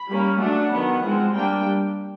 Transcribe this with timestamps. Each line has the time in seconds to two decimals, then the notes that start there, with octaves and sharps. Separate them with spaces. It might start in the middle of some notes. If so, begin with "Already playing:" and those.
Already playing: B5
0.08 G3 A#3 C#4
0.40 F#3 A3 D4 F#5
0.71 D#3 F#3 B3
1.02 F3 G#3 C4
1.34 G3 A#3 D4 G5